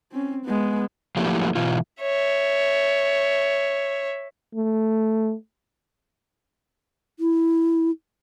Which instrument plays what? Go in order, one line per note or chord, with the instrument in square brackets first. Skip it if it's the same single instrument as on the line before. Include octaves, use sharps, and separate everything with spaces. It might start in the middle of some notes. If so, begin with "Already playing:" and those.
[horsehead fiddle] C4 C#4
G#3 B3
[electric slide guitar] F3 F#3 A3 A#3 E4 G4
B2 E3 F4
[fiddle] C#5 E5
[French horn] A3
[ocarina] E4